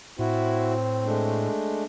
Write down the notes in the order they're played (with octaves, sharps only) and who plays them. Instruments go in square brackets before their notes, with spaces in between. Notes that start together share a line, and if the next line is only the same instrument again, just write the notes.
[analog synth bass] A2 [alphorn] C4 [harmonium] E4 F#4
[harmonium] G#3 A3 D4